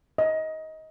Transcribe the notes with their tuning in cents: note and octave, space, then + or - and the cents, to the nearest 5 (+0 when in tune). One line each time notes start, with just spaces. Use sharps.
D#5 +20